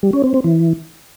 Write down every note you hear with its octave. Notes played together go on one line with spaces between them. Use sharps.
G3
C#4
C4
C4
E3